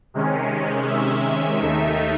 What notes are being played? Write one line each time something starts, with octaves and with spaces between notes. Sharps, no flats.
C3 D#3 G#3 C#4
E5
D#2 D#3 A3 D#4 E5